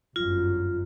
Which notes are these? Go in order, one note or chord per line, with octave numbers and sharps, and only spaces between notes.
G1 F#2 F4